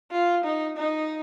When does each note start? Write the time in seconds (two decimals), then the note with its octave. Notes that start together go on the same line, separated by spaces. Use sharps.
0.12 F4
0.44 D#4
0.77 D#4